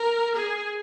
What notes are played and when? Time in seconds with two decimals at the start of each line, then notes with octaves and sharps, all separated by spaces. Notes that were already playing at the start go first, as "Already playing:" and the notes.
Already playing: A#4
0.35 G#4